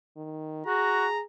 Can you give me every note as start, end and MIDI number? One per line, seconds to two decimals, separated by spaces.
0.17 0.61 51
0.66 1.06 66
0.66 1.22 68
0.66 1.22 82